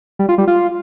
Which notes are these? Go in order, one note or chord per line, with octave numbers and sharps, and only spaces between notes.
G3
F4
G3
F4